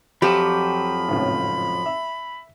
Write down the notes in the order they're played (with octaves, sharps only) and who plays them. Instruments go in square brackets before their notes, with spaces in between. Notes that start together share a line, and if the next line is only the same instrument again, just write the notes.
[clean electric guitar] F2 F3 F#3 [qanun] G4 [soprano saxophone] B5
[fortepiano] G#1 C#2 A2
E5